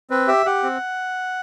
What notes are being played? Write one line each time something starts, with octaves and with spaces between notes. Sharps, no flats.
C4 B4
G4 E5
G4 F#5
C4